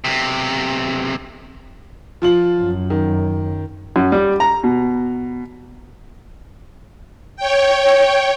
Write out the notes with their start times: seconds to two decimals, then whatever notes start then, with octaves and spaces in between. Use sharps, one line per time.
0.04 B1 C3
2.22 F3 F4 F#7
2.57 F#2
2.90 D#3
3.96 F#2
4.12 G3
4.40 A#5
4.64 B2
7.36 C#5 G5